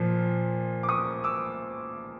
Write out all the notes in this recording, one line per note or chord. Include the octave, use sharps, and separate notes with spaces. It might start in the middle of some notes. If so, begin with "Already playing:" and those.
Already playing: A#2 F3
D6
C#6 D#6
D6 E6